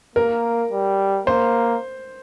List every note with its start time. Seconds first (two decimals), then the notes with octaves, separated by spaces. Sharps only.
0.16 A#3 A#4
0.72 G3
1.27 A#3 C5